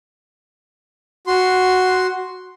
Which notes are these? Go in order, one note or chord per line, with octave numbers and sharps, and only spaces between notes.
F#4 C6